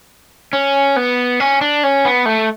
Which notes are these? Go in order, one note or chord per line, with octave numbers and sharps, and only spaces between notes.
C#4
B3
C#4
D4
C#4
B3
A3